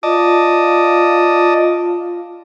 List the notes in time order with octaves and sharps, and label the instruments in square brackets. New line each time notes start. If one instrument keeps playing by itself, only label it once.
[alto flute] F4 [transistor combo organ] D5 D#5 A5